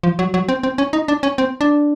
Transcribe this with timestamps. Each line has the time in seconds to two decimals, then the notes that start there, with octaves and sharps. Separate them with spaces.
0.03 F3
0.19 F#3
0.34 F#3
0.49 C4
0.63 C4
0.78 C#4
0.93 D#4
1.08 D4
1.23 C#4
1.38 C4
1.61 D4